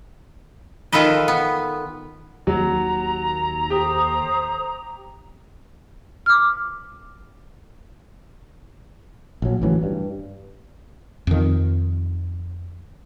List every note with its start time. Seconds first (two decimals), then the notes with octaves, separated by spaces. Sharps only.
0.92 D#3 F4 A4 B4 D#5
1.28 B3
2.47 D#2 F#3 A#5
3.70 G4 A4 C5 D#6
6.26 D6 F6
9.42 A#1 F#3
9.62 A1 D2 E3 F#3
9.83 G2
11.27 F2 D#3